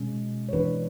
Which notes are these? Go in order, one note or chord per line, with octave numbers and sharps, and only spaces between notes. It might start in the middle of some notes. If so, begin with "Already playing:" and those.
Already playing: B2 G#3 C#4
C#5
E3 B3 D4 B4